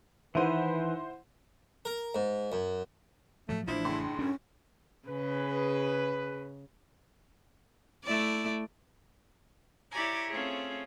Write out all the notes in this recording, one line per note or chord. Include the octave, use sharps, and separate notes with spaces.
D#3 E3 E4 B4 C5 F#5 D#7
A#4
G#2
F#2
A2 F3 F#3 A3
A1 F3 D4 E4 C5
F#1 A2 C6
F#2 C#4 D4
C#3 G#4 B4
A3 E4 D5
E4 G4 C#5 D5 G#5 A#5
A3 C4 C#4 F4 G#4